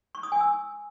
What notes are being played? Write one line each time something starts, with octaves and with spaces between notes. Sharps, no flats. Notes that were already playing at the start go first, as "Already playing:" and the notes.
C#6
D#6
G#5
E6